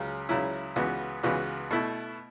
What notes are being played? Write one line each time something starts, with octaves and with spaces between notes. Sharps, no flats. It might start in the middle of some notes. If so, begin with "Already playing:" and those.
Already playing: C#2 C#3 F#3 C#4
C#2 C#3 F#3 C#4 E4
C#2 C#3 E3 B3 F#4
C#2 C#3 E3 B3 F#4
B2 A3 E4